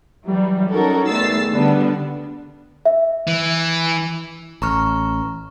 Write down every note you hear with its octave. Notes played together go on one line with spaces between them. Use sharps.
E3 F#3 G3
C#4 D#4 F#4 A4 A#4
E2 D#3 A3 E6 A6 C7
D3 G3 B3 D4
E5
E3
A1 A#5 C#6 F6